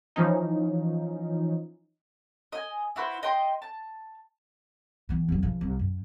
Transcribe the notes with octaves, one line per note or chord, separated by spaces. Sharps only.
E3 F3 C#4 D#4
D#5 G#5
E4 F#4 B4 C5
D#5 G5 C6
A5
E3 B3
F2 F#3
C#3 F3
C2
F#2